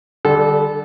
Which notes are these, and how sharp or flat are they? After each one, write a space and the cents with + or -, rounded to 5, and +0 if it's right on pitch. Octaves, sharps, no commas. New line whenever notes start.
D3 +25 G3 +0 A4 -25